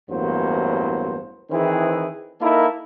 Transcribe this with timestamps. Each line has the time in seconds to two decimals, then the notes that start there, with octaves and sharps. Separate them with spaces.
0.10 A1 E2 G2 F#3 A#3 C5
1.51 D#3 E3 C4 E4 G#4 B4
2.41 A#3 D#4 E4 A4 A#4